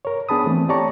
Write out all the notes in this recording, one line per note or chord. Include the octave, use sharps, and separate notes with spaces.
A#4 C#5
B3 D4 G#4 A5 B5 D#6
E3 A3 C4
G4 C#5 D5 A5 A#5 C#6